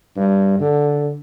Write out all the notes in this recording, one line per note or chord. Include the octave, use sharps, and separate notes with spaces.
G2
D3